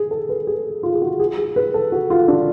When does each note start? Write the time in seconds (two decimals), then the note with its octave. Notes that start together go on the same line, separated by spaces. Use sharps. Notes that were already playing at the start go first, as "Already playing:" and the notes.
Already playing: G#4
0.11 A4
0.29 B4
0.47 G#4
0.83 F4
0.94 G#4
1.02 F#4
1.20 G#4
1.38 G#4
1.56 B4
1.74 A4
1.92 F#4
2.10 F4
2.28 D4